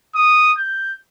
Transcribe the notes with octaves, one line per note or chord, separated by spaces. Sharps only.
D#6
G6